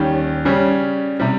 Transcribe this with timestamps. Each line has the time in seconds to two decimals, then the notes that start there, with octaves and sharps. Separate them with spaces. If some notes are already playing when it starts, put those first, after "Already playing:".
Already playing: D#2 D#3 G3 C#4 G4
0.45 C#3 G3 C#4
1.20 C3 G3